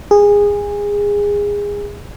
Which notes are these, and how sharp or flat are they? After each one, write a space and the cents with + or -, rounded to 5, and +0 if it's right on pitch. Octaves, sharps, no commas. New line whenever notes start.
G#4 -20